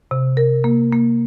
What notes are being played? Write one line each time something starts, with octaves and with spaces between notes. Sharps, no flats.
C3
A#4
A#3
A#3